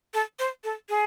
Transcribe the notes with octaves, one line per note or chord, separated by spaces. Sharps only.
A4
C5
A4
G#4